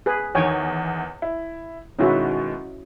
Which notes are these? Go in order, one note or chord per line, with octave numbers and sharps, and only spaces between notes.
G#4 B4
E2 D#3 C#5 G5 G#5
E4
B2 D#3 G#3 C#4 E4 F#4